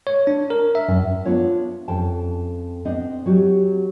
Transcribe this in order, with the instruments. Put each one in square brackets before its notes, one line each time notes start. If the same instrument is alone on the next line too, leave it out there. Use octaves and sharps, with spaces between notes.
[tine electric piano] C#5
D4
A#4
E5
F#2
[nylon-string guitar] B3 D4 F4 C#5
F2 C#4 G5 A5
B3 C4 D4 D#5
F#3 F#4 G4